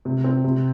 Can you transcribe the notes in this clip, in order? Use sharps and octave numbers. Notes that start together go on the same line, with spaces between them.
C3
C4
C3